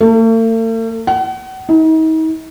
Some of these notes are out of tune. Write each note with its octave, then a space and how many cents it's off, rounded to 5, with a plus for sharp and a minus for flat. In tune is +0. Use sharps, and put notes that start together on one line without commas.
A3 +45
F#5 +35
D#4 +40